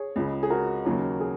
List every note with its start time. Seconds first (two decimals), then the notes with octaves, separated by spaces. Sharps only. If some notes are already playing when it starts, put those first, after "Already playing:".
Already playing: G#4 C#5
0.16 C#2 C#3 G#3
0.43 G#4
0.50 F#4 A#4
0.85 D#2 C#3 F#3 A#3
1.20 G#4